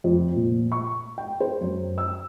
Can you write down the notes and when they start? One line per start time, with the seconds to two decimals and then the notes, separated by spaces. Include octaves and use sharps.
0.04 F2
0.36 A#2
0.72 C#6
1.18 G5
1.40 C5
1.61 F#2
1.98 E6